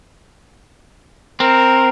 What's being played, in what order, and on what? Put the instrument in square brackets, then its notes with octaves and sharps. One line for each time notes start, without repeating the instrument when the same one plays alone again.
[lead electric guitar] C4 [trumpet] A#4